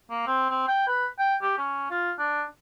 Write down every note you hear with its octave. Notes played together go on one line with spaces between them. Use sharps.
A#3
C4
C4
G5
B4
G5
G4
C#4
F4
D4